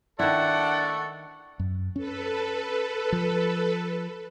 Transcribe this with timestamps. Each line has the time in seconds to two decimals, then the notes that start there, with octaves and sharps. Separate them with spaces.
0.19 D#3 D4 E4 A4 D5 F#5 C#6
1.60 F#2
1.96 C#4 A4 B4
3.12 F3